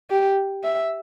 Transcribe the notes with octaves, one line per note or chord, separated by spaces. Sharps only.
G4
E5